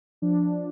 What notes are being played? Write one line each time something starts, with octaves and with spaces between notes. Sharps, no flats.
F3 D4